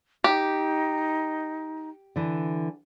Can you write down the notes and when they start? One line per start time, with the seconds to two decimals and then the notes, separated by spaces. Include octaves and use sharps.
0.24 D#4 G4
2.16 D3 E3